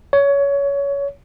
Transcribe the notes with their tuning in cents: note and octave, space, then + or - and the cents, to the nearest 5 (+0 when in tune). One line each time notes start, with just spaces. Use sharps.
C#5 +20